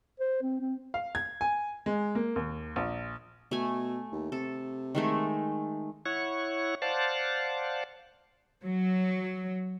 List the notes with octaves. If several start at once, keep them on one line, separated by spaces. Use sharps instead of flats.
C5
C4
C4
F5
G#6
G#5
G#3
A#3
D#2
A#1
B2 A3 G#5
D#2
C3 A4
D#3 G#3 A3
E4 C#5 F#5 C#6
C5 D5 F5 F#5 A5
F#3